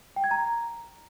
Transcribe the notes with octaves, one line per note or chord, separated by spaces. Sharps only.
G5
G#6
A#5